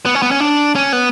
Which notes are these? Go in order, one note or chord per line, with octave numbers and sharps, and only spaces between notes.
B3
C#4
B3
C#4
D4
C#4
B3